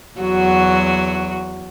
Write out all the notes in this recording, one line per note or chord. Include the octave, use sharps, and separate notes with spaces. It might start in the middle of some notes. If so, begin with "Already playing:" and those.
E2 F#3 F#4